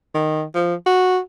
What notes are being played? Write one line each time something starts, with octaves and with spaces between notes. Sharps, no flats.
D#3
F3
F#4